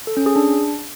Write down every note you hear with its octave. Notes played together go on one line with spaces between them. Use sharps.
A4
C#4
G#4
D4